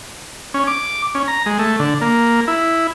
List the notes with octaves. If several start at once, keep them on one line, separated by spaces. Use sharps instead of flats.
C#4
D6
C#4
A#5
G#3
A3
D3
A#3
E4